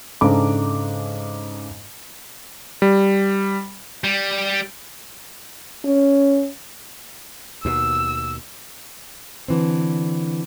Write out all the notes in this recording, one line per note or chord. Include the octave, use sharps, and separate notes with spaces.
G#2 C#3 D4 A4 A#5 D6
G3
G3
C#4
D#2 B2 E6
D3 E3 C4